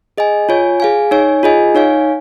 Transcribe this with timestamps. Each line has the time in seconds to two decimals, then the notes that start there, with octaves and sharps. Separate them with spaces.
0.18 G#4 D#5 G#5
0.49 F4 C#5 G#5
0.80 G#4 F5 G#5
1.11 D#4 C#5 G#5
1.43 F4 G#4 D#5 G#5
1.75 D#4 C#5 F5 G#5